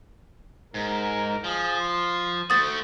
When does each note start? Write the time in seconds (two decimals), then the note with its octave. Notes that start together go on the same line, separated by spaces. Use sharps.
0.74 G#2 A#4
1.44 F3 G#4
1.79 C6
2.50 A3 F#4 C5 D#6 A6